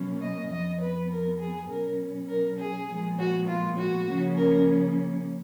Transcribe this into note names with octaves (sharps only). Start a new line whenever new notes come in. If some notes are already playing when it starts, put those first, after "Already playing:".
Already playing: B2 F#3 A#3 C#4
D#5
F2 F3 B3 D#5
B4
A#4
G#4
B2 F#3 C#4 A#4
A#4
G#4
A#2 F3 G#3 B3
F#4
F4
F#4
C#3 F3 A#3 C#4
A#4